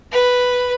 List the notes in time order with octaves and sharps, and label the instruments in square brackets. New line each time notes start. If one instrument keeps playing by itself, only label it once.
[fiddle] B4